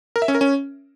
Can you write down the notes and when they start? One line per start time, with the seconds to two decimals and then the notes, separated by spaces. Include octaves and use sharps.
0.16 A#4
0.22 E5
0.28 C#4
0.35 A#4
0.41 C#4